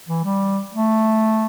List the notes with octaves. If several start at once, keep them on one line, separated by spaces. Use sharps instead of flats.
E3
G3
A3